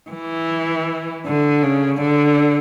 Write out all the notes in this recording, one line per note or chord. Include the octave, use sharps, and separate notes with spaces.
E3
D3
C#3
D3